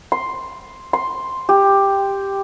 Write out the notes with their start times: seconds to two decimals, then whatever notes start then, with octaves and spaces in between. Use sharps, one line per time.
0.12 C6
0.93 C6
1.49 G4